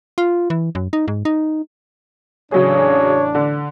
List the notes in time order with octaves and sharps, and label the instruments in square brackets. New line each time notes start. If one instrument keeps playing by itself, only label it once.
[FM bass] F4
E3
F#2
D#4
G#2
D#4
[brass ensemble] A1 D4 [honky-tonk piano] C#3 F#3 G#4 [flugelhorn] C#5
[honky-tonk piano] D3